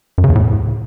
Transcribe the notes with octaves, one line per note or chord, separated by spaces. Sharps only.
F#2
C#3
E2
A2